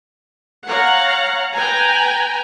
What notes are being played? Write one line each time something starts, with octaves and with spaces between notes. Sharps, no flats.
C#5 F5 F#5 A#5
B4 G5 G#5 A#5